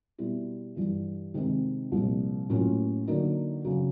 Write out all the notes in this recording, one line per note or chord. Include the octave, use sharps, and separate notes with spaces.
B2 G3 B3 E4
G2 E3 G3
C3 D#3 G#3 C4 D#4
C2 A#2 F3
A2 F#3 A#3 C#4 F4
D3 F#3 A#3 D#4
C#3 F#3